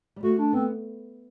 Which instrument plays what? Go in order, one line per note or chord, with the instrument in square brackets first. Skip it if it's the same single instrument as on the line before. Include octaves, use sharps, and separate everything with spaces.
[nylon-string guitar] G3
[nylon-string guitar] A3 [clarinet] F#4
[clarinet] D4
[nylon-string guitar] B3 [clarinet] C4